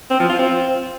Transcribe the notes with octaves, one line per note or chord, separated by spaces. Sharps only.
C4
F3
F4
C4